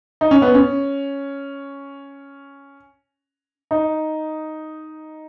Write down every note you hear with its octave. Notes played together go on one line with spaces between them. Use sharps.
D#4
C#4
B3
C#4
D#4